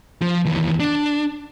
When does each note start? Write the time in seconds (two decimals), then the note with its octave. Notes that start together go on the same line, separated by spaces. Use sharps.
0.22 F3
0.45 D#2 E3
0.80 D4